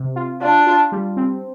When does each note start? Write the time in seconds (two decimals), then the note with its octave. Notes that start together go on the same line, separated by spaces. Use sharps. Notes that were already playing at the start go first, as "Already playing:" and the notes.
Already playing: C3
0.16 F4
0.41 D4 F4
0.67 F4
0.92 G3
1.17 C4